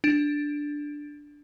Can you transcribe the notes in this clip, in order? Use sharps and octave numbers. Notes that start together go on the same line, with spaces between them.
D4